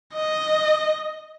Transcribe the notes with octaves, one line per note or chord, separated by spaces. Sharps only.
D#5